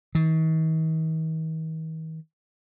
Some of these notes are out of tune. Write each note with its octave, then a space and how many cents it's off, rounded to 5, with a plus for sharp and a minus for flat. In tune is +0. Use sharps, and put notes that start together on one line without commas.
D#3 +45